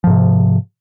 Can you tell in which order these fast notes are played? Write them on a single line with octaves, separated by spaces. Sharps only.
F3 G#2 C3